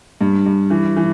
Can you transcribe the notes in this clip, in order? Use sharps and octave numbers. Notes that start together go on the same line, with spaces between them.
G2
G2
E3
E3